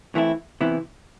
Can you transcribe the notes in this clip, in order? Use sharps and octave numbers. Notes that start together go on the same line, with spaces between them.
E3 A3 C4 E4
C3 E3 B3 E4